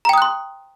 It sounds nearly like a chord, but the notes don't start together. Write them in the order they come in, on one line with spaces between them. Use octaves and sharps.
A#5 G5 D#6 F#6 C6